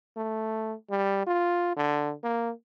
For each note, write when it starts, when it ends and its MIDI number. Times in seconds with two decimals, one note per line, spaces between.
0.17 0.74 57
0.90 1.26 55
1.27 1.75 65
1.77 2.14 50
2.24 2.51 58